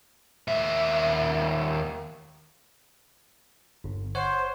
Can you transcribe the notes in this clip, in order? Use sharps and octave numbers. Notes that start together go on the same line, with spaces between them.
D#2 E5
G1
C5 C#5 F#5